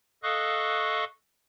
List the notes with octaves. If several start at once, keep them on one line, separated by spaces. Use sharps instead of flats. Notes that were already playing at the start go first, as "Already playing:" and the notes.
A4 D#5 F5 C#6 D#6 F#6